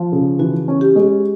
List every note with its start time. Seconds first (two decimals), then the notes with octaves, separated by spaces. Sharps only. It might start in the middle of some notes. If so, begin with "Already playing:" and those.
Already playing: F3
0.12 C#3
0.39 E3 F#4
0.68 C#4
0.81 G4
0.96 G#3